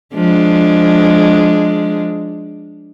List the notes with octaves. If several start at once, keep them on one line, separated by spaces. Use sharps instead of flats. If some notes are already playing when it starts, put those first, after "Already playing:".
F3 G#3 D4